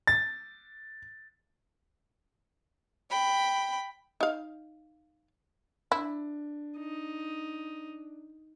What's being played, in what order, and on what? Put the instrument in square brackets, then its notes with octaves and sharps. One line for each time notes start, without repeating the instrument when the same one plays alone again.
[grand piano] A6
[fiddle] G5 B5
[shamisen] D#4 F5
[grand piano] D4 [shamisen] E4
[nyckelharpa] D#4